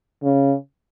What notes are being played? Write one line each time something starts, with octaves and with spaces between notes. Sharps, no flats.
C#3